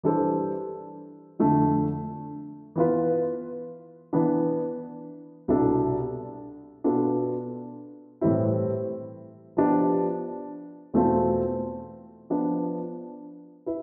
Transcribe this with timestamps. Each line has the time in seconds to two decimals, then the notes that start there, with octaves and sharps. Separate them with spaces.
0.03 E3 G3 D4 A4 C5
1.39 F2 D3 A3 D4
2.76 E3 B3 F4 B4
4.13 E3 B3 D4
5.48 C2 B2 G3 D4 A4
6.84 B2 B3 D4 F4 A4
8.21 A2 E3 G3 C4 E4
9.57 F3 B3 D4 G4
10.94 E2 B2 A3 C4 F4
12.30 F3 B3 D4
13.66 E4 B4